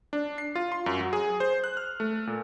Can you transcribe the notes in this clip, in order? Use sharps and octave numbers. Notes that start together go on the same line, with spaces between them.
D4
C7
F4
C6
F#2
F#3
G#4
C5
F#6
F6
A3
A#2